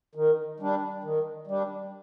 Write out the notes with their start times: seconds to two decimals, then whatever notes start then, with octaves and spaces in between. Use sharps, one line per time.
0.15 D#3
0.60 G3 D4
1.04 D#3
1.47 G3 D4